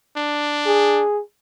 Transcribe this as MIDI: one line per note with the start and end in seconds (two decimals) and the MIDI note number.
0.16 1.04 62
0.66 1.20 68